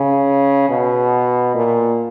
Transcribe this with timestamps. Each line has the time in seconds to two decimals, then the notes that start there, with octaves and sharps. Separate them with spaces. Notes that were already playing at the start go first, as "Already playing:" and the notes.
Already playing: C#3
0.69 B2
1.55 A#2